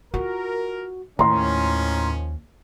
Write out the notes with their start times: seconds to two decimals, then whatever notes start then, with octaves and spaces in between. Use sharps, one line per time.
0.14 F4 F#4 A#4
1.19 D#2 A2 D#3 F3 C#4 A#5 C6